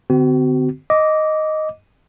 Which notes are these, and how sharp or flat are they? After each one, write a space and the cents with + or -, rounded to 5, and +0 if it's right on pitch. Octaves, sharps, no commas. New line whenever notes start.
D3 +0 C4 -35 F#4 +35
D#5 +0 D6 -15